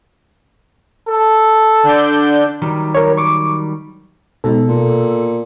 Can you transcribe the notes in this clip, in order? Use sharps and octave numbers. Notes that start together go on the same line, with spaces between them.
A4
D3 D4 G6
D#3 F#3 G3
A#4 C#5
C#6 D6
G#2 B2 A4
A#2